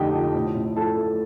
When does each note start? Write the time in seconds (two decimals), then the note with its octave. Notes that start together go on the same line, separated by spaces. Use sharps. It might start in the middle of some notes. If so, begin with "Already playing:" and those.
Already playing: F2 D3 A3 D#4 G4 D#5 G5
0.14 F3
0.35 A2
0.55 A2
0.76 F3 A4 A5
0.97 A3